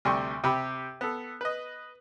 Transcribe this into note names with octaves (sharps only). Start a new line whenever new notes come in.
D2 C3 G3 C6 C#6
C3 G4 B5
B3 A4
B4 D#5